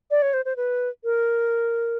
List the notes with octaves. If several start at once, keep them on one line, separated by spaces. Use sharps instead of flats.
D5
C#5
C5
C5
B4
A#4